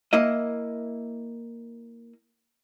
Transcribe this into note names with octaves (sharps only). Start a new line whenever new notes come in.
A#3 E4 D#5